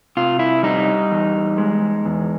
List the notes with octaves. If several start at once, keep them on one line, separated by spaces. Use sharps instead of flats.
C3 F4
E4
G3 D#4
E2
G#3
E2